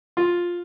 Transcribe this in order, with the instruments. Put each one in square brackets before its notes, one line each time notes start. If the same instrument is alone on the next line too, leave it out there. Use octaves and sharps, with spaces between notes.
[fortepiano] F4